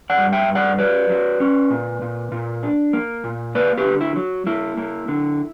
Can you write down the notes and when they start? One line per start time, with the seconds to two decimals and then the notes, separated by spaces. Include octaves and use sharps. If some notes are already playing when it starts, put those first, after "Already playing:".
0.10 D5 F#5
0.17 G2
0.33 E5 G5
0.48 G2
0.55 D5 F#5
0.78 F#3 B4 D5
1.09 F#3
1.40 C#4
1.70 A#2
2.02 A#2
2.32 A#2
2.63 D4
2.93 A#3
3.24 A#2
3.55 A#3 B4 D5
3.77 G4 B4
3.85 D3
4.01 E4
4.16 F#3
4.47 A#3 E4
4.77 A#3
5.08 D3